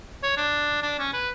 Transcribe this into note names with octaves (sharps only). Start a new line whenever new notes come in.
C#5
D4
D4
C#4
B4